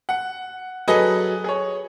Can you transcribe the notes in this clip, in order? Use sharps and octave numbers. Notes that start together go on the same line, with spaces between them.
F#5
F#3 G#4 A4 B4 D#5
G#4 C#5